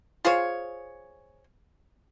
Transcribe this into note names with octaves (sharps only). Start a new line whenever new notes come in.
F4 G#4 C5 C#5